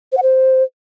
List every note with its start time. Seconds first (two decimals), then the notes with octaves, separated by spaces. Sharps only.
0.12 C5
0.17 F#5
0.22 C5